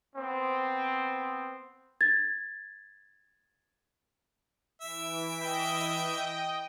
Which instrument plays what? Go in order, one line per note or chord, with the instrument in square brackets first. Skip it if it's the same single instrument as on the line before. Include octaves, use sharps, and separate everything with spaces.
[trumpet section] B3 C4
[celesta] G#6 A6
[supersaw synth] E3 D7 [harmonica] E5
[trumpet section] D#5 G5